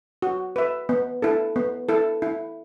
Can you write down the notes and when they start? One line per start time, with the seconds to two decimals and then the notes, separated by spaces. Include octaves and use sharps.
0.22 F#4
0.56 B4 E5
0.89 B3
1.22 E4 A4
1.56 B3
1.89 E4 A4
2.22 E4